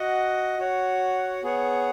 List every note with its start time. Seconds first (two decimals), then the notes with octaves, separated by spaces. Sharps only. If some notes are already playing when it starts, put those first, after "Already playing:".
Already playing: F#4 D#5 F#5
0.58 F#4 C#5 F#5
1.43 B3 G#4 C#5 F#5